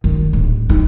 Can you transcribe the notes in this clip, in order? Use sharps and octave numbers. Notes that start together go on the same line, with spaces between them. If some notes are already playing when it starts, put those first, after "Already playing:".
D#3
D1
D#4